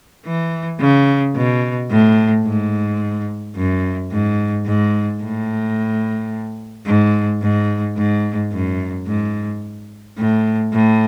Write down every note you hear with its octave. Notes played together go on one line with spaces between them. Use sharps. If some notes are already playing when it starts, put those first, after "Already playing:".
E3
C#3
B2
A2
G#2
F#2
G#2
G#2
A2
G#2
G#2
G#2
F#2
G#2
A2
A2